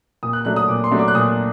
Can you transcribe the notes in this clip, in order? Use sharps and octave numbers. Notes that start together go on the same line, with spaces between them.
A#2 D#6
F#6
F#3 A3 D4 F#6
D#6
A#2 D6
C6
F#3 A3 D4
D6
F#6
A#2 D#6